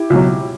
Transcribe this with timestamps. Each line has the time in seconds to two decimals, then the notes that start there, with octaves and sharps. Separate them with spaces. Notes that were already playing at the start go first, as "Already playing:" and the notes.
Already playing: E4 G4
0.10 C#2 B2 F#3